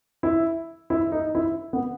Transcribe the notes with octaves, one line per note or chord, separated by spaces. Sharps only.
E4
E4
D#4
E4
B3